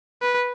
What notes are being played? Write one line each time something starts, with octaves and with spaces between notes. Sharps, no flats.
B4